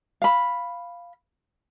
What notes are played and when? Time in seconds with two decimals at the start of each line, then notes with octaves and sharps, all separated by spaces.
0.22 F5 B5